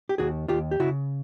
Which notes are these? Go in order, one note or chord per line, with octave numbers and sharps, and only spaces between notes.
G4
D#2 F#4 G#4
D#2 F4 G4
G4
C#3 E4 F#4